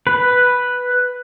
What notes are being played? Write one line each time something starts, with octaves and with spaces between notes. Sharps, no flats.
B4